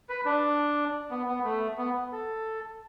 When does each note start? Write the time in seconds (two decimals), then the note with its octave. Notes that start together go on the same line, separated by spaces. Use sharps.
0.09 B4
0.26 D4
1.11 B3
1.27 B3
1.44 A3
1.78 B3
2.12 A4